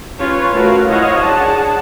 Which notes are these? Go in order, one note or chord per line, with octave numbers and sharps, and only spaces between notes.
C#4 F4 B4 C#5
A3 F4 F#4 A#4 B4 F5
E4 C5 C#5 D#5 F5 F#5
D4 G#4 F#5 A5